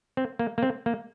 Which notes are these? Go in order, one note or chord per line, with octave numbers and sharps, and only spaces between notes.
C4
A#3
A#3
C4
A#3